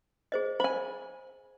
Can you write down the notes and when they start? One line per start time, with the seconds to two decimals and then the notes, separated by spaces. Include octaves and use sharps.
0.32 G#4 C5 D#5
0.60 C5 G#5 B5